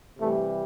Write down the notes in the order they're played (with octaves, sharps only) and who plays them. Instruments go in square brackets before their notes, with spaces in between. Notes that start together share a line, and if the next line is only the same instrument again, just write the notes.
[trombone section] C3 E3 G3 A3